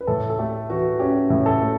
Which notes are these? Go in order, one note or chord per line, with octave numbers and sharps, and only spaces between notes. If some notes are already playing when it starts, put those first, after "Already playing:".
B4
A2 A4
A4
A3 G4
E3 F#4
C#4 G4
A2
A4
A3